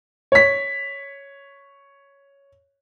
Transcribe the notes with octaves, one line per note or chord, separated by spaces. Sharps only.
C#5 B6